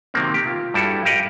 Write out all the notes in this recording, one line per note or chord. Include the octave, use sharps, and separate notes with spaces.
C3 D#3 F#3 A#3 C4
G4 A#4
F4
G2 G3 E4 F#4 G#4 A4
G4 A#4 D#5 F5 F#5